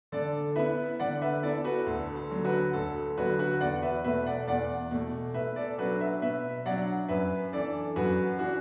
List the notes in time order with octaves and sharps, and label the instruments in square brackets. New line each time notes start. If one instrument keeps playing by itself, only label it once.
[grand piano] D3 A4 D5
B3 E4 B4 E5
D3 D5 F#5
B4 E5
B3 E4 A4 D5
F#4 B4
D2 A4
A4
D3 F#3
F#4 B4
D2 A4
A4
D3 F#3 F#4 B4
F#4 B4
E2 D5 F#5
B4 E5
B2 A3 B4 E5
D5 F#5
E2 D5 F#5
B2 A3
B2 B4 E5
A4 D5
F#3 D4 F#4 B4
B4 E5
B2 B4 E5
F#3 D4 D5 F#5
F#2 B4 E5
E3 D4 A4 D5
F#2 F#4 B4
E3 D4 F#4